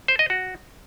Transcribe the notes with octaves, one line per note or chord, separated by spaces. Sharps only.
C5
D#5
F#4